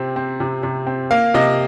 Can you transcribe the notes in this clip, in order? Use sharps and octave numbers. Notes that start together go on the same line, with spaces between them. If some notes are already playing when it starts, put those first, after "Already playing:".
Already playing: C3 C4
C4
C3
C3
C4
A#3 F5
C3 D#5